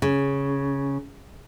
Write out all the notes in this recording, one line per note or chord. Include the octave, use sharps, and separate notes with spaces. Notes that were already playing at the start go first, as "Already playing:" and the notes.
C#3